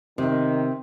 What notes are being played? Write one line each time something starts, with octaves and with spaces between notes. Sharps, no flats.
C3 D#3